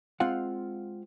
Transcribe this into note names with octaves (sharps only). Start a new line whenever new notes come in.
G#3 C4 F4 F5 F#5